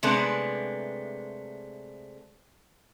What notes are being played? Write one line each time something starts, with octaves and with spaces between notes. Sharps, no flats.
C3 G#3 A3 B3 D4